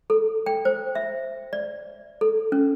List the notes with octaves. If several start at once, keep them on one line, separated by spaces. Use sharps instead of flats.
A4
G5
C5
E5
D5
A4
C#4